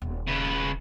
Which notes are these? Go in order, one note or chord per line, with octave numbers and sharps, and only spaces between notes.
D#1
C#3 B4